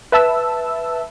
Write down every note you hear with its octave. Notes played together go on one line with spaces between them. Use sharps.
B4 E5 A5 E6